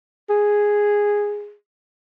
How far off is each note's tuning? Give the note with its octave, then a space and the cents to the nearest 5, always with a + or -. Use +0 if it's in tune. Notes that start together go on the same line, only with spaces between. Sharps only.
G#4 -5